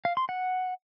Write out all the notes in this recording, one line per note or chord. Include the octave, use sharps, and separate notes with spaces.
F5
C6
F#5